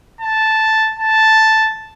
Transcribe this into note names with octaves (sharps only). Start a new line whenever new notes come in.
A5
A5